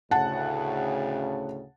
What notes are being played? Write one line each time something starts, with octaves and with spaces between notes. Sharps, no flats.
D2 A2 C#3 F#5 A5